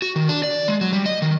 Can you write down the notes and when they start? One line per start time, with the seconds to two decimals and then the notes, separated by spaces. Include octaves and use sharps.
0.02 F#4
0.16 D#3
0.29 D4
0.43 D5
0.68 G#3
0.81 F#3
0.93 G3
1.06 D#5
1.22 D#3